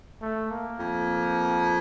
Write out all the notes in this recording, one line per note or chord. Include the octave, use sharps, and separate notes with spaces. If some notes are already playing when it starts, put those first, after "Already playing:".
A3
A#3
F2